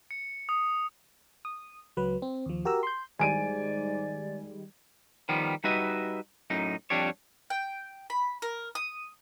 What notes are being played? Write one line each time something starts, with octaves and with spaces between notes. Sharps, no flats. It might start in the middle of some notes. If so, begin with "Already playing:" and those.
C#7
D#6
D#6
C#2 F#3 B4
C4
D#2 F3
F#4 G4 A#4 A#5 E6
C6 G6
G#2 D#3 G3 G#3 D5 G#5 D7 D#7
D#3 F3 G3 B3
G3 D#4 F#4 B4 D#5 E5
F#2 A2 D#4
F2 G3 D4 G4 C#5
G5
B5
A#4
D#6